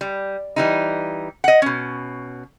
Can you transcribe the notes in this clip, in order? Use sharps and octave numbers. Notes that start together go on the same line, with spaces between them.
G3
E3 G3 D#4
D#5 F#5
B2 C#4